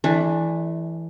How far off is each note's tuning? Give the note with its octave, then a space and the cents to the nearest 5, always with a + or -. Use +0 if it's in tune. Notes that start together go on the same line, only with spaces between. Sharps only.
E3 +0 A3 -30 D4 +5